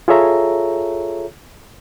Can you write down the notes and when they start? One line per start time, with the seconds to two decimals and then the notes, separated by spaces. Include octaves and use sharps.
0.08 F4 G#4 A4 C#5 E5 A#5